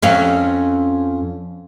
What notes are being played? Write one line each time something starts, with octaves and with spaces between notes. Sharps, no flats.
F2 C#4 F5